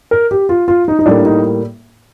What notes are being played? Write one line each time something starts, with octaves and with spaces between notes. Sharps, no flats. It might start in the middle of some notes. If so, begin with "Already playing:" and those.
A#4
G4
F4
F4
D#4
D#4
A2 G3 A#3 D4
D#4